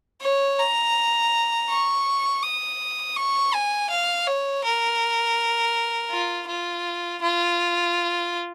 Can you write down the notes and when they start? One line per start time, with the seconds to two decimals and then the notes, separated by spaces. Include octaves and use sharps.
0.21 C#5
0.59 A#5
1.70 C#6
2.43 D#6
3.17 C#6
3.54 G#5
3.90 F5
4.27 C#5
4.64 A#4
6.11 F4
6.48 F4
7.22 F4